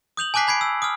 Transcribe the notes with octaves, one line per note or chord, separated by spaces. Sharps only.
D#6 G6 F7 F#7
G#5 A5 D6 F#6 B6 C7
G#5 B5 G#6 C7 D7
E6
D#6 F6